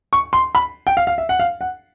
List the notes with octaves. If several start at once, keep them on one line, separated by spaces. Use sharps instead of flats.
C#6
C6
B5
G5
F5
F5
E5
F#5
F5
F#5